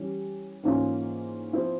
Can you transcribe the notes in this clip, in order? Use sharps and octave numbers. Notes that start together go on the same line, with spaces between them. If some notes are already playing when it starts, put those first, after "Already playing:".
Already playing: E3 G3 C#4 G4
G#2 E3 A#3 C#4 F4
F3 C4 E4